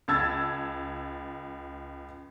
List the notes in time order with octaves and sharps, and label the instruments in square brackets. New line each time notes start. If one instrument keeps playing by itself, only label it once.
[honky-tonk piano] C#2 A5 E6 G#6 A6